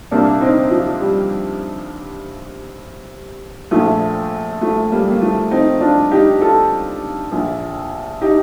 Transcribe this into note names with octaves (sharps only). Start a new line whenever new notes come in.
C2 A#2 A#3 D4
C4 D#4
F3
G3
A#1 A#2 F3 A3
F3 A3
G3 A#3
A#3
F3 A3
C4 D#4
D4 F4
D#4 G4
F4 A4
A#1 A#2
D#4 G4